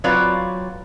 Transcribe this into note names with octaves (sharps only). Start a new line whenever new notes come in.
F#3 C4 F4 B4 C#5 D5